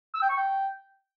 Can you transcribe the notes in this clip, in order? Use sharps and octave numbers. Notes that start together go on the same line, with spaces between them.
E6
G5
C#6
G5